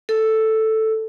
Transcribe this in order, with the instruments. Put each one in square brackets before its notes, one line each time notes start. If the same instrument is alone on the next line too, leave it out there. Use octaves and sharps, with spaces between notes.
[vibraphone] A4